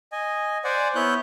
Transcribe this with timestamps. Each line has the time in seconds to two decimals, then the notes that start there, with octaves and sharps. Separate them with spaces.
0.12 D#5 G#5
0.64 C5 D5 F#5 G#5
0.95 B3 E4 C#5 F#6 G6